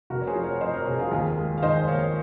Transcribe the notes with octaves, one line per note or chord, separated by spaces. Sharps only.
F1 F#4 A#4
C#5
G#4 C5
F3
A#4 C#5
F2 C5 D#5
A#4 C#5
F1 G#4 C5
F4 G#4
D#2 F4 G#4
G#3
F5
D#3 C5 D#5
D#2 C#5 F5